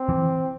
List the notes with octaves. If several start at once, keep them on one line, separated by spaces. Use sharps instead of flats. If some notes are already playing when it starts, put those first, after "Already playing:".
Already playing: C4
E3